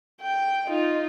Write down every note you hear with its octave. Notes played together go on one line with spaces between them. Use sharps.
G5
D#4 F4